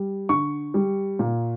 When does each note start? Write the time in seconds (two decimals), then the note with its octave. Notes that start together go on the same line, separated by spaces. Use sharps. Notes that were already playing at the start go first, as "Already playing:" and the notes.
Already playing: G3
0.29 D3 C#6
0.74 G3
1.19 A#2